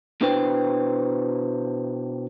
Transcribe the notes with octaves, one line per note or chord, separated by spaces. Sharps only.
B2 D4 E4 B4 C5 G5